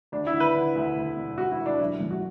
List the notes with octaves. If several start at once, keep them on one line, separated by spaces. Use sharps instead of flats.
D2 D4
E4
D3
B4
D3
D2
D2
E1
E1 F#4
E4
D2
D4
F#1 E4
F#2
F#4